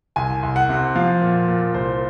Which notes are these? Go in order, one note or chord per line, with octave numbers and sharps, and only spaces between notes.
C2 G#5
C2
F#5
C3
F3 F5
A#2
A#2
C2 C5